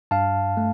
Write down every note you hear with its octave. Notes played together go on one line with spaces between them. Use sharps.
G2 F5 A5
A3